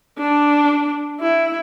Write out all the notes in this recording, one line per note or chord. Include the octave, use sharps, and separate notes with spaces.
D4
E4